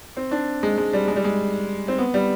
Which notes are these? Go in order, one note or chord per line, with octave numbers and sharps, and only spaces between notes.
C4
D4
G#3
G#3
G3
G#3
G3
G#3
C4
B3
G3